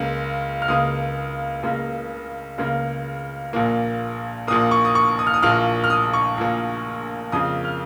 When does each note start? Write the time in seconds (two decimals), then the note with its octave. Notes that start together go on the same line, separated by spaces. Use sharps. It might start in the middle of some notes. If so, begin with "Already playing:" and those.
Already playing: C#2 C#3 A#3
0.62 F6
0.68 C#2 C#3 A#3 D#6
1.63 C#2 C#3 A#3
2.58 C#2 C#3 A#3
3.53 A#1 A#2 A#3
4.47 A#1 A#2 A#3 D#6
4.71 C#6
4.85 D#6
4.95 C#6
5.19 D#6
5.27 F6
5.34 D#6
5.42 A#1 A#2 A#3 F6
5.84 F6
5.90 D#6
6.13 C#6
6.38 A#1 A#2 A#3
7.32 F2 C#3 A#3 D#6
7.65 F6